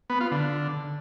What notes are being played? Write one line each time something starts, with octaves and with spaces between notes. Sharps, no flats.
B3
F4
D3